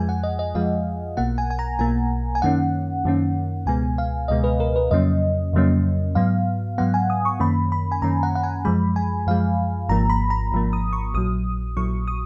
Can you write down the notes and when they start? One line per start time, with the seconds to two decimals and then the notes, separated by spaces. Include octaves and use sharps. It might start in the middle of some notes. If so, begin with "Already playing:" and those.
Already playing: F2 F3 G#3 G#5
0.09 F#5
0.23 D#5
0.39 D#5
0.55 F2 F3 G#3 F5
1.17 B1 B2 A#3 F#5
1.38 G#5
1.50 G#5
1.59 A#5
1.79 B1 B2 A#3 G#5
2.35 G#5
2.42 F#2 D#3 A#3 C#4 F#5
3.05 F#2 D#3 A#3 C#4
3.66 C#2 B2 G#3 B3 G#5
3.98 F5
4.28 C#2 B2 G#3 B3 D#5
4.44 B4
4.60 A#4
4.76 B4
4.91 F2 C#3 F#3 A#3 C#4 D#5
5.53 F2 C#3 F#3 A#3 C#4
6.15 G#2 F#3 B3 F5
6.78 G#2 F#3 B3 F#5
6.94 G#5
7.10 D#6
7.25 C#6
7.40 F#2 D#3 A#3 C#4 B5
7.72 B5
7.92 G#5
8.02 F#2 D#3 A#3 C#4 A#5
8.23 F#5
8.35 F#5
8.43 G#5
8.65 F#2 F3 G#3 B5
8.96 G#5
9.27 F#2 F3 G#3 F5
9.89 G#1 G#2 F3 A#3 A#5
10.10 B5
10.30 A#5
10.52 G#1 G#2 F3 A#3
10.73 D#6
10.93 C#6
11.14 A#1 A#2 F#3 D#6
11.77 A#1 A#2 F#3 C#6
12.08 D#6